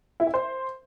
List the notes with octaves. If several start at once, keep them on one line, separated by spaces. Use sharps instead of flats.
E4
E5
C5